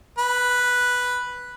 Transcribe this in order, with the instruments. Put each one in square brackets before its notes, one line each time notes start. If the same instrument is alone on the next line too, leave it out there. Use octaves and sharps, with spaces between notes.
[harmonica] B4